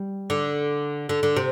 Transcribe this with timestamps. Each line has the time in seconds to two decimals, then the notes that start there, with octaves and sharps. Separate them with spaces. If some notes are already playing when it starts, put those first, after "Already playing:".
Already playing: G3
0.30 D3
1.09 D3
1.23 D3
1.36 C3